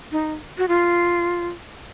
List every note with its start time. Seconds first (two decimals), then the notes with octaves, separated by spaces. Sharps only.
0.12 D#4
0.58 F#4
0.68 F4